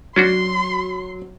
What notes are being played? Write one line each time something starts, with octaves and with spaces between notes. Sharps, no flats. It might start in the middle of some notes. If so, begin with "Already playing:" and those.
F#3 C#4 D4 F#4 C6